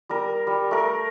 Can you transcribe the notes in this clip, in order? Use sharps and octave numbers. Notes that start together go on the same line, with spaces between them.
G3 A#4
G3
A3 A#4